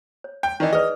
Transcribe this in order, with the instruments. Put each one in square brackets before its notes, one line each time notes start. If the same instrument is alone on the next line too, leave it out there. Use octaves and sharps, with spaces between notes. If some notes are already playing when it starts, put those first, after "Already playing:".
[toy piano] C#5
[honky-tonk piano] G5
[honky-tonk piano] D#3 E3 [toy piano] D#4 D5 D#5
[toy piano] G#4 B4 D5 [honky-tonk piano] D#5